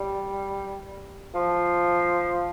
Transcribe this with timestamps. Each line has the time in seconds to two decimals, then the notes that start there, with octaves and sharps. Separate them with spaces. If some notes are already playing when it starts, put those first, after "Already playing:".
Already playing: G3
1.35 F3